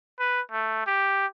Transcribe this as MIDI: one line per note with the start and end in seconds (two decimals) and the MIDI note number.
0.20 0.41 71
0.51 0.82 57
0.87 1.26 67